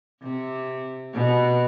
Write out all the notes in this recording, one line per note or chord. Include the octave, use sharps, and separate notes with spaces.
C3
B2